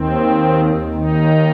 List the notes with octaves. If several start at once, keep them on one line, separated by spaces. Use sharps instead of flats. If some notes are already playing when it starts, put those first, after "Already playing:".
Already playing: D#2 D#3 C4
D#2 D#3 D#4